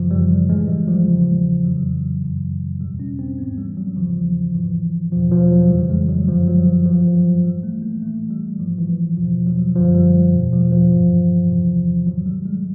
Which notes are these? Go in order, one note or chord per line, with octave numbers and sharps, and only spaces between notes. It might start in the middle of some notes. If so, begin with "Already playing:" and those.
Already playing: F#2 C#3 E3 F3
G3
A2 E3 G#3
G3
F3
E2 C#3 E3
F2 C#3 E3 F#3
F#2 C#3 E3
E2 B2 G3
C#4
C4
G#2 E3 B3
G3
F#3
E2 C#3 E3 F3
G#2 E3
E2 B2 F3
F3
F#3
F2 C#3 E3 G3
G#3
F#3
F#2 D3 F3
F#3
F3
G2 E3 F3
F3
F#3
A2 E3 G3
A3
A#3
A2 E3 A3
G3
G#2 E3 F3
E3
E2 B2 F3
F#3
F#2 D3 F3
G3
E2 B2
F3
F3
G2 E3
E2 C3 E3
G#2 D#3 F#3
G3
G#3